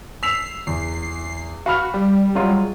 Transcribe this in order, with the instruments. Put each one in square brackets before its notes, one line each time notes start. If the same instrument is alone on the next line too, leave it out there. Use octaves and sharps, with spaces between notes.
[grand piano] E6 B6 F7 [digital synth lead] C7
[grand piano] E2 [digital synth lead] C7
[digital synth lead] F#4 [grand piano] F5 B5 F6
[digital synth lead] G3
[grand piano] F#3 G#3 F4